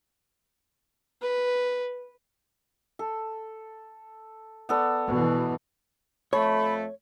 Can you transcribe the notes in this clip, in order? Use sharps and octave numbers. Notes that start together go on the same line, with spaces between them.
B4
A4
B3 A4 D5
B2 E3
F2 A3 C#5 B5